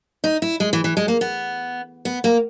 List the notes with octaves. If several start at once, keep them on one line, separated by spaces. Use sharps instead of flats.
D#4
E4
G#3
E3
E3
G#3
A#3
B3
B3
A#3